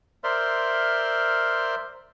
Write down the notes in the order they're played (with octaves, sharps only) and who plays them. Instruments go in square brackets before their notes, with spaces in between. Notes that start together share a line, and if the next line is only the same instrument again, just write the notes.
[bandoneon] A#4 C5 D5 E5 C6 F6